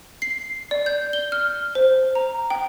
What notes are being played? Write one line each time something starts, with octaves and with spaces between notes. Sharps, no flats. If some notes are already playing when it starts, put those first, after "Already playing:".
C7
D5
G6
G7
F6
C5
A#5
G5